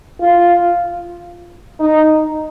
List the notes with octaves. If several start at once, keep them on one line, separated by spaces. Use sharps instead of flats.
F4
D#4